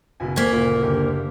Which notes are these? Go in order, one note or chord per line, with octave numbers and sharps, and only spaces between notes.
F#1 B2 G#5
D2 A#3 G#5 G#6 B6
F#1 A#2
F#1 D3 G4